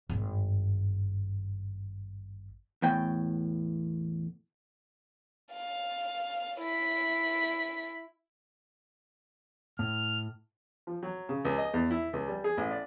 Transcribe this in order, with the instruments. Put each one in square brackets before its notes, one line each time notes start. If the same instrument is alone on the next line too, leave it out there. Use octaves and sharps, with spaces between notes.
[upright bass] G#1 G2
[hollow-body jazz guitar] E2 A2 G5
[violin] F5
E4 B6
[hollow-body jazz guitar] A2 [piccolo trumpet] F6
[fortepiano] F3
F#3
C#3
C#2
D#5
E2
E4
C#2
G3
G#4
A1
D5